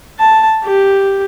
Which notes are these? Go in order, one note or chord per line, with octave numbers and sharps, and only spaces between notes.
A5
G4